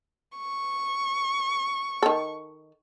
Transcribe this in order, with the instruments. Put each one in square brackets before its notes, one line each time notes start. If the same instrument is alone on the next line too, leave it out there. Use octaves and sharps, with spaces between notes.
[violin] C#6
[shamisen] D#3 A4